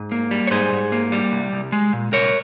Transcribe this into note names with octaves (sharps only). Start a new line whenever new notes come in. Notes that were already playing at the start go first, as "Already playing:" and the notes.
Already playing: G#2
A#3
G3
C#5
G#2 G#4 C5
G#2
A#3
G3
C2
C2
G#3
A#2
C2 A#4 C#5